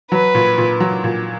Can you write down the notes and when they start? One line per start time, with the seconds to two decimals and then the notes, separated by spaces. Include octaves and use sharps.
0.11 F#3 B4
0.35 A#2
0.58 A#2
0.80 F#3
1.04 A#2